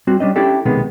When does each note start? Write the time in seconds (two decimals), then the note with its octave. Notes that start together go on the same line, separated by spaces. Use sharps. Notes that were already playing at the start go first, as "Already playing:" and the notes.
0.07 G3 C4 F#4
0.20 G3 C#4 D4 D#5
0.36 C#4 D4 E4 G4 A4
0.65 B1 C3 D#3 G#3 B3